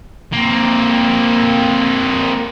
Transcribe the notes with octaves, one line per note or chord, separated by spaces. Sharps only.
A#3 C4